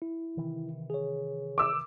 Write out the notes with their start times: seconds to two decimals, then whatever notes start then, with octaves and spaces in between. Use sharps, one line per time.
0.02 E4
0.37 C3 D#3 E3
0.90 G#4 C#5
1.58 D6 E6